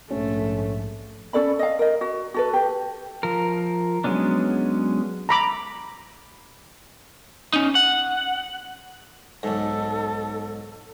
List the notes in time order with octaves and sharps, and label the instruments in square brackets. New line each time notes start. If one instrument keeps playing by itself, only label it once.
[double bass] A#1 G#2 [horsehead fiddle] A3 [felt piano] C#4
[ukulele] C#4 A4 D5 B5
D#5 F5
A#4 D#5
F#4
F#4 A4 B4
G4
[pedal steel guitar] F3 A#4
F#3 G#3 B3 C#4 D4
[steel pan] A#5 B5 D6
[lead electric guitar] C#4 D#4
F#5
[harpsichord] B1 G#2 [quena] A4